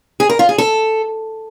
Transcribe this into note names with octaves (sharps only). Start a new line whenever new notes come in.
G#4
A#4
F4
G#4
A4